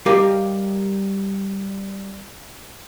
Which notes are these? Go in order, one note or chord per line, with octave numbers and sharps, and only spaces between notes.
G3 G4 A#4 D#5 F5